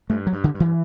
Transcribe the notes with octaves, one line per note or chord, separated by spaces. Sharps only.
G2 A3
F#3
G2
D3
G2
E3